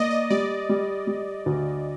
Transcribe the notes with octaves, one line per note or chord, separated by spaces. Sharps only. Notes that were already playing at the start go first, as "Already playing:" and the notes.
Already playing: A#3 D5 D#5
D#5
G3 D5
G3
G3
D2